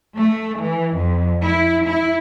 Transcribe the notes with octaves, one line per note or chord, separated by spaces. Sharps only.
A3
E3
F2
E4
E4